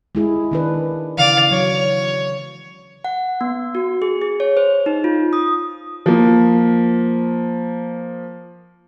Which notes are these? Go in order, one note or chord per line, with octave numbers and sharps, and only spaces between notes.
G#3 E4 G#4
D#3 D4 B4
C#3 E3 D5 F5
F#3 C#5
F#5
B3
F#4
G#4
G#4
C#5
C5
D#4
F4
D#6
F3 A#3